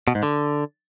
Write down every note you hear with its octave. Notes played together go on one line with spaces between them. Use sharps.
B2
G#2
D3